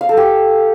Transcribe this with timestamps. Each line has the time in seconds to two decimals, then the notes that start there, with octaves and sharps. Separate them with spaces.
0.01 F5
0.09 A4
0.17 G4